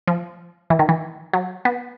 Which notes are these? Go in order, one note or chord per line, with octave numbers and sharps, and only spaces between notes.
F3
E3
D#3
E3
F#3
B3